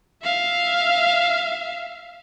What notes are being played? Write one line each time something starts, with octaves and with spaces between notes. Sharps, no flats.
E5 F5